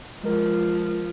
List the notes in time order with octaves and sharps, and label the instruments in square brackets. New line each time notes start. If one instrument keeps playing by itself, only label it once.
[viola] F3 [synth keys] G#3 A#4